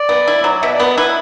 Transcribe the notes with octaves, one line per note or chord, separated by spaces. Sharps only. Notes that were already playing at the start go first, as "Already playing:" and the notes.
Already playing: D5
B3
E4
F#3
B2 E5
D5
B3
E4 B4